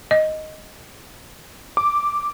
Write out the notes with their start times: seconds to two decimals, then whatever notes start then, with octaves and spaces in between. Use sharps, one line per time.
0.11 D#5
1.77 D6